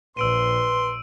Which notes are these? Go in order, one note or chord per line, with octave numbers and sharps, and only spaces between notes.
A#1 B4 C6 E6 D7 D#7